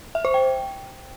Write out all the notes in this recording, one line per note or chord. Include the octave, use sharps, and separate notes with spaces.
E5
C5
G5